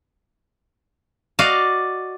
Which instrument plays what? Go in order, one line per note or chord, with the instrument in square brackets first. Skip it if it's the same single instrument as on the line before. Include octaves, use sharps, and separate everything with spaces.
[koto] F#4 D5 D#5 F5